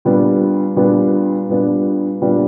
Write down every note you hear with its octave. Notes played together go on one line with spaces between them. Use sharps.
A#2 G3 B3 D4
A#2 G3 B3 D4
A#2 G3 B3 D4
A#2 G3 B3 D4